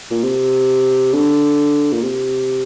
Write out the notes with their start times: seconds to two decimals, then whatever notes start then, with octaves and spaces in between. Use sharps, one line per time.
0.11 A#2
0.23 C3
1.13 D3
1.92 A#2
2.03 C3